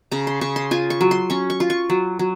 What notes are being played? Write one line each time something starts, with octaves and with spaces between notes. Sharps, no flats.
C#3 A#5
C6
C#3 C#6
C6
F4 G#5
C#6
F#3
C6
C#4 C#6
C#6
F4
C#6
F#3
F#3